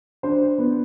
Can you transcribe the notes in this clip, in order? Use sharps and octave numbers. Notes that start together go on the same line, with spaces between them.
D4 C5
B3